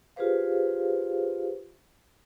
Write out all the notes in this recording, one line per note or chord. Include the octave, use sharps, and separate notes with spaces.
F4 G4 G#4 B4 C5 F5